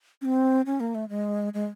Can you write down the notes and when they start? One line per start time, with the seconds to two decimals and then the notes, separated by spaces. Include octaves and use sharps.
0.21 C#4
0.25 C4
0.66 C#4
0.80 A#3
0.95 A3
1.09 G#3
1.54 G#3